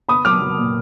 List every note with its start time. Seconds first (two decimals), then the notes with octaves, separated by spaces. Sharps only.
0.09 B3 B5 D#6
0.25 F#3 D6 F6
0.41 F#3
0.58 A#2